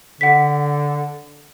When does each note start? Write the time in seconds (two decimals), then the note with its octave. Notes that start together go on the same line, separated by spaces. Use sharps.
0.21 D3 F#5 B6